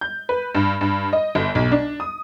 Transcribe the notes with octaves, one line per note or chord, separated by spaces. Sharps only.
G6
B4
G2
G2
D#5
G1
B1
D4
D#6